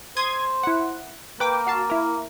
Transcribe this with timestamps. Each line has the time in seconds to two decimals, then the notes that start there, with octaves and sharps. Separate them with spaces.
0.17 C5 C6 D#6 G#6
0.63 E4 F#5
1.40 A#3 B4 G5 D6
1.67 F#4 F5 A5
1.90 E4 A#4